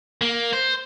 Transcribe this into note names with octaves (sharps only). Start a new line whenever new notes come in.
A#3
C5